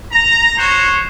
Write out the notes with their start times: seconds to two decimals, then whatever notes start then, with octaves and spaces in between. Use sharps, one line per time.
0.12 A#5
0.58 F#4 C5 C#5